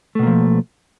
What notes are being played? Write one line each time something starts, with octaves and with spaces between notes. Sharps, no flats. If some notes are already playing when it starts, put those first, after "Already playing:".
B2 F3 A3 A#3